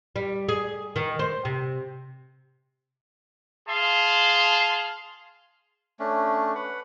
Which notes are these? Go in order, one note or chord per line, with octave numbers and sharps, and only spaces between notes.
G3
G#4
D#3
C5
C3
G#4 F5 A5 C6
A3 C#4 D4
B4 F#5